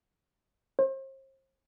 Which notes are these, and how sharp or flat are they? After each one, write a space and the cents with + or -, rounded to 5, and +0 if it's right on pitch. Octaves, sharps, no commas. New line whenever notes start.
C5 +40